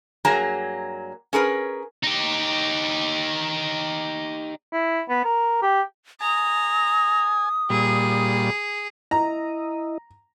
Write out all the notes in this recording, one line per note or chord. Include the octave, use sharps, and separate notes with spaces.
G2 F#3 A#3 G#4 A#5
C#4 G#4 A#4 B4
D#4 G4
E4
B3
A#4
G4
G#5 A#5 D#6
A#2 G3 G#4
E4 D#5 A#5